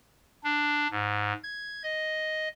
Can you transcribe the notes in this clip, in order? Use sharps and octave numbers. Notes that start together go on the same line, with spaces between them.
D4
G#2
G#6
D#5